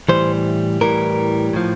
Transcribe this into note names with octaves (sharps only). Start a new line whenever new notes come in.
A2 E3 G3 C5
A2 E3 G3 A#4
A2 F3